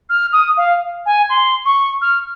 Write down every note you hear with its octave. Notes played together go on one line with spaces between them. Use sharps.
F6
D#6
F5
G#5
C6
C#6
F6